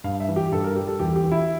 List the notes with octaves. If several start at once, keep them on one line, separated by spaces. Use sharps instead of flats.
G2 F5
E5
E3
G4
G2 A4
A#4
G3 G4
A4
E2 G4
G4
E3
E4